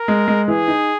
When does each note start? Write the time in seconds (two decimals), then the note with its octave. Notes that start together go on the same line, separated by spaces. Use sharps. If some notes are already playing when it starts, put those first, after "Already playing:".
Already playing: A#4
0.08 G#3
0.28 G#3
0.48 E3 G#4
0.68 D#4